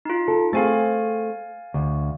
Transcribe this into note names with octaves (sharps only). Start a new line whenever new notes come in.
D#4 F4
A4
A3 C4 G#4 F5 G#5 A6
D2